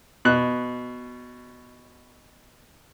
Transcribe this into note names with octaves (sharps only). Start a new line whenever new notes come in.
B2 F#6